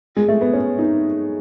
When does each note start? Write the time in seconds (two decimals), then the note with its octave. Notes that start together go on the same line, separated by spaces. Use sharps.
0.17 G#3
0.29 A3
0.41 B3
0.53 C#4
0.79 D#4